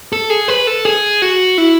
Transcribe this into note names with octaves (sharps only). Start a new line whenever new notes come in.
A4
G#4
B4
A4
G#4
F#4
E4